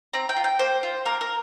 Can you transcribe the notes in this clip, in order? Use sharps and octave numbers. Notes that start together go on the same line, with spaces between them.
C4 A#5
G5
F4
G5
A#3 C5
F4
A#3 A#4
A#4